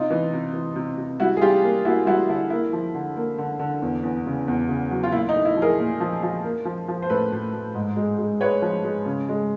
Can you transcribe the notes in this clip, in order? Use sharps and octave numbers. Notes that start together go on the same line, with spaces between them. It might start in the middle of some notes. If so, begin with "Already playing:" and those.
Already playing: C3 D#4 F4
E3
C3
E3
C3
C3
G3 E4 F#4
G#4
G3 F4 G4
A#3
A#3 E4 F#4
G3 E4 F#4
D3 E4
A#3 E4
F3
D3
A#3
D3
D3
E2
E2
C#3
E2
C#3
F#3
F4
A#2 E4
D#4
A3
E4
F3
G#4 A#4
A#2
F3
F3
A#3
F3
F3
C5
A2 A4 B4
A2
A2
G#2
G#3
G#3
G#3 B4 C#5
F3
G#3
C#3
G#3